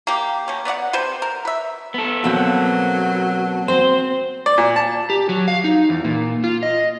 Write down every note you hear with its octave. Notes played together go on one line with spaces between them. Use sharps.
A#3 G4
B2 C#4
B3 D5 D#5 F#5
C3 B4 C5
A#4
B4 E5
B3 A4
B2 F#3 A#3 C4
C4 C5
D5
A#2
A5
G4
F#3
F5
D#4
E2
A#2
F4
D#5